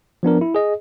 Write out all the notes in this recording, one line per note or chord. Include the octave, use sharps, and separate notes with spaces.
F3 B3 D4 A#4
E4
G#4 D#5